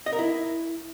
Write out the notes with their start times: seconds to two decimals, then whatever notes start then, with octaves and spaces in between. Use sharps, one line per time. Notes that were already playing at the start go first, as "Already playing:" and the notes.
0.06 D#5
0.13 A#4
0.19 E4